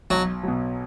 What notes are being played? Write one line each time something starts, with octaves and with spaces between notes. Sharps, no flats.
B1 F#3
B2 F#3